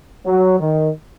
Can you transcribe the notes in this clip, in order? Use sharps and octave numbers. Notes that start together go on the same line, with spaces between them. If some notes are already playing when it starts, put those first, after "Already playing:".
F#3
D#3